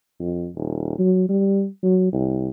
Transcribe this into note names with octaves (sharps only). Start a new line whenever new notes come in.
F2
D#1
F#3
G3
F#3
C2